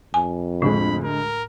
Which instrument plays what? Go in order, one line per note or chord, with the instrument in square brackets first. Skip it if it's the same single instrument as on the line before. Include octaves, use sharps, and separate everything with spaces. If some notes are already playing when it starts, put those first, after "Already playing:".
[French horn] F2 [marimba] G#5
[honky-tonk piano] D2 G#3 [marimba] A2 [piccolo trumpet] B5
[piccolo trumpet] A#4